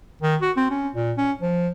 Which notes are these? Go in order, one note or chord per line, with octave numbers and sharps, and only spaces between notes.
D#3
F#4
C4
C#4
A#2
C#4
F3